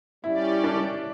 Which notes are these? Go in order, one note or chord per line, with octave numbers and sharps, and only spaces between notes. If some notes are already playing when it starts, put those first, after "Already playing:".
G3 C#4 E4 G4 D5
D4